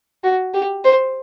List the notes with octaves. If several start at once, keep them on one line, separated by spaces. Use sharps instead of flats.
F#4
G4
C5